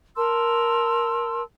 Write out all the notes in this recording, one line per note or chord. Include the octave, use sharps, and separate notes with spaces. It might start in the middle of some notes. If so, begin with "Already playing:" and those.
A#4 A5 C6 E6